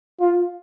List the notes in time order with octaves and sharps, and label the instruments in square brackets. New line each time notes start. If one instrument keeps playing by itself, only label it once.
[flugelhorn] F4